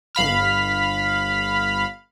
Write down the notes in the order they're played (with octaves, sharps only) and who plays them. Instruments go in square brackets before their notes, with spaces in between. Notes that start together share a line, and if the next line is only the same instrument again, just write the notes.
[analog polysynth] G1 F5 B5 F6